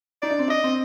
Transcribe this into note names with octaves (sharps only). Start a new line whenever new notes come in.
D#4 D5
D4
C4
D4 D#5
C4